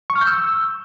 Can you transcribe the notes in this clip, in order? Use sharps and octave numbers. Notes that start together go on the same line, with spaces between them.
C#6
F6
G6
E6